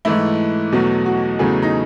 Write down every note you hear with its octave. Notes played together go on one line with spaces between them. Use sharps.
G#2 E3 A3 E4
E2 B2 F#3 A3
F#4
E2 C#3 F#3 A3 G#4
D#4